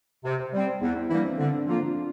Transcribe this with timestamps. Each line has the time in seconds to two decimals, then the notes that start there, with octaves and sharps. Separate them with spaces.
0.24 C3 C5
0.39 C5
0.53 G3 D5
0.57 C4
0.67 C5
0.81 E2 E4
0.96 E4
1.10 E3 G3 A#3 D4 E4
1.24 C4
1.38 D3 C4
1.52 D4
1.66 F3 A#3 C4 F4
1.81 D4